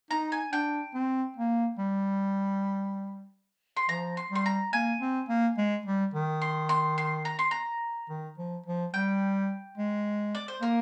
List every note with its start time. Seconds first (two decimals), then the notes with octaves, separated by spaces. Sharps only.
0.11 D#4 A#5
0.32 G#5
0.52 D4 G5
0.94 C4
1.36 A#3
1.78 G3
3.77 C6
3.89 F3 A#5
4.17 C6
4.30 G3 C6
4.46 A#5
4.73 A#3 G#5
5.01 C4
5.29 A#3
5.57 G#3
5.86 G3
6.14 D#3
6.42 C6
6.69 C6
6.98 C6
7.25 A#5
7.39 C6
7.51 A#5
8.09 D#3
8.38 F3
8.66 F3
8.93 G3 G5
9.78 G#3
10.35 D5
10.48 C5
10.62 A#3 A#4